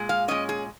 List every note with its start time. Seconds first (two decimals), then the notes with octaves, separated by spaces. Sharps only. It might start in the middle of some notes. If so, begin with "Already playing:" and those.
Already playing: A#2 G#3
0.09 F5
0.28 A#2 G#3 C#4 D#5
0.49 G#4